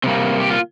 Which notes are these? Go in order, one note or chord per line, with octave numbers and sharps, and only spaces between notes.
C3 G3 A#3 C4
G4
F4